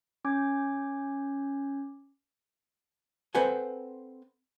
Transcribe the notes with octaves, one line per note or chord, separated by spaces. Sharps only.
C#4 D6 G6 G#6
C4 A4 B4 C5 F#5 G#5